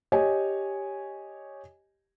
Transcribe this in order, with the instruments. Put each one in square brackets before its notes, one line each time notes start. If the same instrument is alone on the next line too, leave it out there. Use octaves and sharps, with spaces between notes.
[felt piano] G4 C#5 D#5 G#5